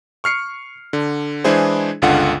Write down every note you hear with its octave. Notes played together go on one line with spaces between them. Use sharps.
C#6 F6 C7 C#7
D3
E3 G#3 D4 E4 G#4 C5
G1 C#2 D3 F4 F#5